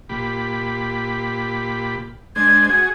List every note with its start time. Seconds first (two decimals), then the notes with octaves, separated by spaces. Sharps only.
0.09 A#2 G4 B5
2.36 G#3 D4 C5 G#6
2.69 F#4 G#4